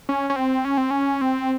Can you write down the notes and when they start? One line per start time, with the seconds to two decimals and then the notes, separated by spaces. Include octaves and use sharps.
0.09 C#4
0.30 C#4
0.36 C4
0.65 C#4
0.77 C4
0.91 C#4
1.21 C4